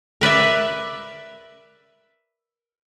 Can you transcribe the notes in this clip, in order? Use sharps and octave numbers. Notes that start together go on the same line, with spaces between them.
A#4 B4 D5 E5